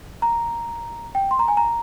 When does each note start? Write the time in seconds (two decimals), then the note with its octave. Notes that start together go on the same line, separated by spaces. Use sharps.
0.22 A#5
1.15 G5
1.31 C6
1.39 A#5
1.48 G#5
1.57 A#5